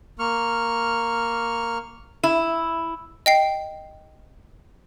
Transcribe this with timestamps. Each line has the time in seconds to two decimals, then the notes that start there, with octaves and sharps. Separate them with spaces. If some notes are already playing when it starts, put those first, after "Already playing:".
0.19 A#3 C#6 F6
2.23 E4
3.26 D#5 G5 C7